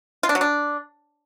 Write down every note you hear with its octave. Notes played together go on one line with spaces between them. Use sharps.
F4
D4
F#3
D4